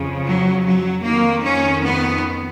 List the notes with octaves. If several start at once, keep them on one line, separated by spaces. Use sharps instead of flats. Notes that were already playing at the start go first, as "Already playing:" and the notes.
Already playing: F2 C#3 F3
F#3
F#3
F2 D#3 A#3
C#4
B3